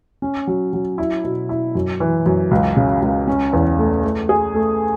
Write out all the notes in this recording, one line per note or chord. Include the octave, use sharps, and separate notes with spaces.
C#4
F#3
F#3
E4
B2
E4
F#2
E3
F#2
C#2
C#3
C#2
C#4
E2
A3
A3
G#4
A3